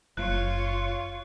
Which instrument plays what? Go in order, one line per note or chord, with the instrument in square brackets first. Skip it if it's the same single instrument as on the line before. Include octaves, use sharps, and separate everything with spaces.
[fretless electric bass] F#1 [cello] F4 C#5 [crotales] F#6